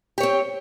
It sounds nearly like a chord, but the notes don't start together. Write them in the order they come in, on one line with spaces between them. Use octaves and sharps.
G4 C#5 C4